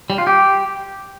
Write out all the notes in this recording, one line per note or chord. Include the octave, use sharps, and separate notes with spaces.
G3
F4
G4